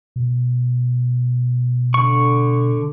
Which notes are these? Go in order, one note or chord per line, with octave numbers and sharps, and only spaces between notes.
B2
D3 C#6